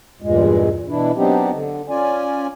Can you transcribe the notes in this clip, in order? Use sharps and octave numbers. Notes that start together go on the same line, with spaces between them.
E2 G2 A#2 G#3
B2 E3 D4 E4
F#3 B3 C4 D4 D#4 G4
D3
C#4 F4 D5 G#5